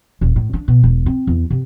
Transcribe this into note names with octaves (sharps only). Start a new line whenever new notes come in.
D#1
A2
D4
B2
E1
C4
E2
C3